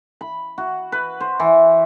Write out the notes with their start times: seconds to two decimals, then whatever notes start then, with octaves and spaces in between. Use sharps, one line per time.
0.21 B5
0.58 F#4
0.92 B4
1.20 C5
1.39 E3